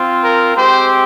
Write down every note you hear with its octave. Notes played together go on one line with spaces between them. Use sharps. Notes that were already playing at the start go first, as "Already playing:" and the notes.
Already playing: C4 F4
A#4
G#3 C4 G4 C5